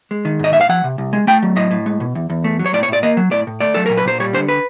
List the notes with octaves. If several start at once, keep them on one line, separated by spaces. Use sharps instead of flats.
G#3
D#3
G#2 D#5
G#2 E5
F5
F3 F#5
C3
C2
G#3
A3 G5
F#3
A2 D#5
A2
G#3
B2
E2
E2
A3
F#3
C#5
A2 D5
C#5
A2
D5
A#3 D#5
F#3
A2 D5
A2
A3 D5
F#3 A4
A#2 A#4
B4
A#2 C5
G3 C#5
D3 C5
B4